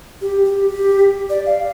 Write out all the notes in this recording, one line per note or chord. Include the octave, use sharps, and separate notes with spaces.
G4
G4
G4
D5
F5